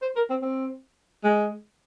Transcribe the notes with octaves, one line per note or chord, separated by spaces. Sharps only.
C5
A#4
C4
C4
G#3